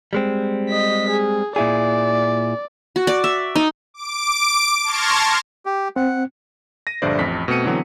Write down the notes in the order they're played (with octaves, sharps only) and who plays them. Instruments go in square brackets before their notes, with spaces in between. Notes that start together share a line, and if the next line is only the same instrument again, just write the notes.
[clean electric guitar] G3 G#3 C4
[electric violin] D#5 B6
G#4
[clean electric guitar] A#2 E4 G#4 [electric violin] D5
[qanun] F#4
D5
E5
D#4
[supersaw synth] D6 D7
A5 C6 C#6 F6 G#6 A#6
[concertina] G4
[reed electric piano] C4 [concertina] F#5
[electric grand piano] A#6 D#7
A#1 G2 D3 C5 D5 E5
A1 F2 B6
B2 A3 C4 C#7 D#7
D3 E3 F#3 B3 C4